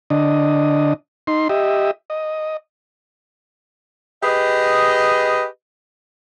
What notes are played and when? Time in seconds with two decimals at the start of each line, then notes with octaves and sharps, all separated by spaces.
0.10 D3 D4 D#5
1.27 D#4 C6
1.49 G4 D#5 E5
2.10 D#5
4.23 G4 G#4 B4 D#5